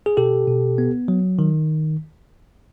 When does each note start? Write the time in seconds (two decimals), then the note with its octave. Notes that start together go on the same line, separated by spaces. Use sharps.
0.06 G#4
0.17 B2 G4 A4
0.48 B2
0.78 B3
1.08 F#3
1.39 D#3